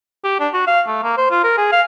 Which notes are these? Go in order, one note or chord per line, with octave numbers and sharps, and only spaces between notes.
G4
D4
F#4
F5
A3
A#3
C5
F4
A#4
G#4
F5